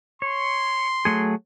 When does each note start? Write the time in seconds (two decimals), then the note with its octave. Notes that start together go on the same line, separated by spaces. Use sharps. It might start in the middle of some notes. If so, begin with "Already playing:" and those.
0.22 C#5 C6
1.05 F#3 A3 G#4